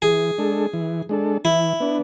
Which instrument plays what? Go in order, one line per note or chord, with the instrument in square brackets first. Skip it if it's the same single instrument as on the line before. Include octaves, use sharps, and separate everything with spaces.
[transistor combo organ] E3 [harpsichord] G#4
[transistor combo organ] G#3 D4 A4
E3
G#3 D4 A4
[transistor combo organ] E3 [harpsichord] E4
[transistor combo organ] B3 D4